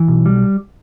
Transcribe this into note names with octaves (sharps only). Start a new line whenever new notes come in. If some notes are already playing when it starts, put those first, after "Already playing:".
Already playing: E3
B1
G3